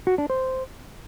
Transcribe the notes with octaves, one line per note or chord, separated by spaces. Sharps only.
F#4
D4
C5